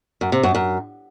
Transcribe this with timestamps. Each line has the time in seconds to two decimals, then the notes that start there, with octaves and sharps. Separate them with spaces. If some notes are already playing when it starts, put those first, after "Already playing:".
0.21 F#2
0.32 C3
0.43 F#2
0.55 F#2